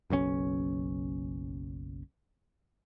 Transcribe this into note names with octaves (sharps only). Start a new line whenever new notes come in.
F#1 B1 B2 C#4